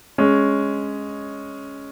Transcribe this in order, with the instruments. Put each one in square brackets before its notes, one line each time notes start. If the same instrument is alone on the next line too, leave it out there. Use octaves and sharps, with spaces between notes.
[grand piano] G#3 C#4